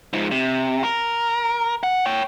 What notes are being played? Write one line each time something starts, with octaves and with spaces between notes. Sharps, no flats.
G#2 F3
C3
A#4
F#5
C#5 G5